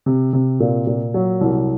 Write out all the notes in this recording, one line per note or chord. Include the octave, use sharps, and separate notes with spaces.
C3
C3
A#2
A#2
F#3
C2